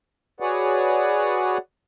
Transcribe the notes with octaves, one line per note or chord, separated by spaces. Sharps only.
F#4 G#4 B4 C#5 D5 F#5